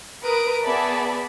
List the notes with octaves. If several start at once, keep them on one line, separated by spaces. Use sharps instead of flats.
A#4 B4 D#6 D7
B3 G#4 D5 E5 A5 B5